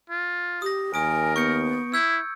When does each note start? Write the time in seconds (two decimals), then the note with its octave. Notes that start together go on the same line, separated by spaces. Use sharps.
0.10 F4
0.62 G4 D#6 A#6
0.94 D#2 A#4 G#5 D#6 D7
1.36 B3 C#6 G6 C#7
1.94 E4 E6 G6 G#6